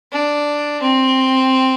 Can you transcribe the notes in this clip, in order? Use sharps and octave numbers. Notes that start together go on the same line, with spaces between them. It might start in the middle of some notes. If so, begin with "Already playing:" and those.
D4
C4